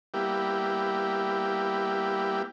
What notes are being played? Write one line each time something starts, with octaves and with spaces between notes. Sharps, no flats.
G3 A#3 B3 E4 G4